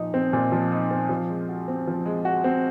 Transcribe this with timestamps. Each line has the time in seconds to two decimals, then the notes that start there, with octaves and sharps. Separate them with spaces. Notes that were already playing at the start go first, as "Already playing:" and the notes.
Already playing: A#2 F3 D#4
0.14 C4
0.33 A#2
0.52 F3
0.71 D#4
0.91 C4
1.09 F3
1.29 G#3
1.49 F#4
1.68 C4
1.87 F3
2.05 G#3
2.25 F#4
2.44 C4